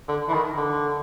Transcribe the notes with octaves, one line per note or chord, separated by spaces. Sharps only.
D3
E3
D#3
D3